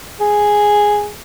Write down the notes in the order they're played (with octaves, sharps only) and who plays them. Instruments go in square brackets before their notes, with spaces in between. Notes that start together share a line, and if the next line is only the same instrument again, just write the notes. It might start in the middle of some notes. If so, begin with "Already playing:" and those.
[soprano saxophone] G#4